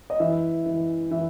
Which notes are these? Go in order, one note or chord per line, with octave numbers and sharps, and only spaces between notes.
D#5
E3 E5
E3
E3 E5